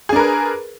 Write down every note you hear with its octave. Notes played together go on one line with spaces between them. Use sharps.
D4 G#4 A#4 B4